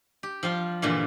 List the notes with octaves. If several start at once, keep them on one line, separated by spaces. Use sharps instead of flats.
G4
F3 G3 F4
G2 A#2 D3 E3